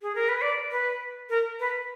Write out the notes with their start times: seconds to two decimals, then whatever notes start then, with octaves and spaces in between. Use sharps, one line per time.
0.02 G#4
0.15 A#4
0.29 B4
0.42 D5
0.71 B4
1.29 A#4
1.60 B4